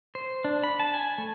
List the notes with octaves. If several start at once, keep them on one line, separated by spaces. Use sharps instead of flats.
C5
D4
B5
A5
G#5
A3